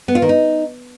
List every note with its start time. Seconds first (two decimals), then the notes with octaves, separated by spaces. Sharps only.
0.08 B3
0.15 F4
0.22 D#3
0.29 D#4